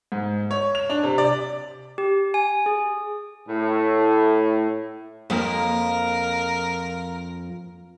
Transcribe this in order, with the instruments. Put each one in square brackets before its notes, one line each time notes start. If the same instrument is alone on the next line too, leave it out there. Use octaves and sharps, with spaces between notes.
[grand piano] G#2
C#5
F7
D4
C3
D5
[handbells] G4
G#5
G#4
[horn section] A2
[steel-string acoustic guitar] F2 F3 A#3 [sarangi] A#4